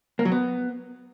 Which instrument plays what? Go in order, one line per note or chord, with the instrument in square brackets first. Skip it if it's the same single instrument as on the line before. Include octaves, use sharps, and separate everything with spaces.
[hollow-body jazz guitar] A#3
F#3
B3